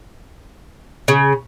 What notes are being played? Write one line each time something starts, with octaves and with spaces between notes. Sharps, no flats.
C#3